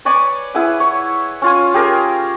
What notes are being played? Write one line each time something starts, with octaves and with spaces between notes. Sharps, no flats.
B4 C#5 D5 G#5
E4 G#4 B4 F#5
C#5
C#4 F4 G#5
G4 G#4 A#4